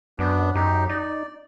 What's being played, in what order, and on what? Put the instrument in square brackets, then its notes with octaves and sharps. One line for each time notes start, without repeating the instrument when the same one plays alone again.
[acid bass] F#2 [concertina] B3 D4
[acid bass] F#2 [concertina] D#4 G4
[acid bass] D#4 [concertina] D5